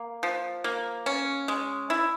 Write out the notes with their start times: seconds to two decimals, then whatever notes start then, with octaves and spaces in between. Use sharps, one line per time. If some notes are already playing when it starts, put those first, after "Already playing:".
Already playing: A#3
0.23 F3
0.64 A#3
1.06 C#4
1.48 G#3
1.90 E4